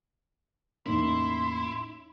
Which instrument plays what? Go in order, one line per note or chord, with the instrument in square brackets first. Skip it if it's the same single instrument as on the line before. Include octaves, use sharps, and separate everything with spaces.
[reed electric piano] E2 A2 A#3 [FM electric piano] C#4 D#4 [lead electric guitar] E4 [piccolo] C6